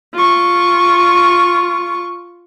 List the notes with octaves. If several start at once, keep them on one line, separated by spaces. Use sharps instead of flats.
F4 C#6